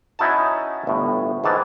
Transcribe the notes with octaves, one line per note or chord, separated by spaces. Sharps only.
C#4 D#4 E4 F#4 D#5 A5
G1 A2
G#2 D#3 E3 A5